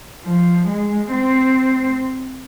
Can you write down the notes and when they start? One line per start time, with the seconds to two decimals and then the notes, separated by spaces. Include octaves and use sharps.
0.25 F3
0.68 G#3
1.12 C4